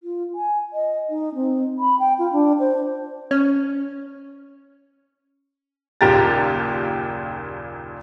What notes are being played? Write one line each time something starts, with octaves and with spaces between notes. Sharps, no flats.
F4
G#5
D#5
D#4
C4
B5
G5
F4
D4
C5
C#4
F#1 D#2 A#2 G4 A#5 A6